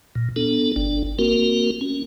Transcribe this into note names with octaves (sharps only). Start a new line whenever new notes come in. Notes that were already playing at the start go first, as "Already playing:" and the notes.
A#2
B3 D4 A4
G1 D4
A#3 C4 F#4 A#4
C#4